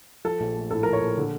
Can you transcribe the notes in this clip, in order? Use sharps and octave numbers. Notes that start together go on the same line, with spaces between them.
F3 A4
A#1
A3
A2 A4
F3 A#4
C#5
A#1
D3